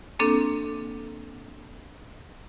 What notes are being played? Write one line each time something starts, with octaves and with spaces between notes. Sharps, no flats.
A#3 C4 D4 A4